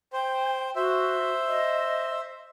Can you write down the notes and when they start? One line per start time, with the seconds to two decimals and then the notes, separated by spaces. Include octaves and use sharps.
0.13 C5 G5
0.76 F#4 C5 E5
1.48 D#5